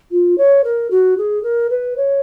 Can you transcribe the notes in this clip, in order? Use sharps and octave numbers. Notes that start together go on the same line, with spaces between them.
F4
C#5
A#4
F#4
G#4
A#4
B4
C#5